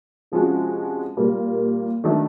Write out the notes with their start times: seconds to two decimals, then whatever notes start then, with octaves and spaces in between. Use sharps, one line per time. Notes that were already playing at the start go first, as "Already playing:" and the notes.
0.32 C3 F3 G#3 C#4 F#4
1.17 A#2 G3 A#3
2.04 D#3 F#3 A3 D4